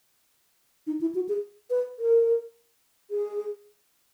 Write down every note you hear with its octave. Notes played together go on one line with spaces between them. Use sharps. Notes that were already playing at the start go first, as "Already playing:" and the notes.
D#4
E4
F#4
G#4
B4
A#4
G#4